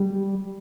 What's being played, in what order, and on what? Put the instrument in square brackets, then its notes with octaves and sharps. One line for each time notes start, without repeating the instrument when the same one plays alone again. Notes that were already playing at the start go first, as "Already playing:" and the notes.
Already playing: [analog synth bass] G3